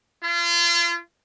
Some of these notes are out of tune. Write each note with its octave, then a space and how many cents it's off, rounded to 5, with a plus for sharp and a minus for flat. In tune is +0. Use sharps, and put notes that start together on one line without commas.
F4 -35